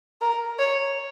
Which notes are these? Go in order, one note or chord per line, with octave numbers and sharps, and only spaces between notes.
A#4
C#5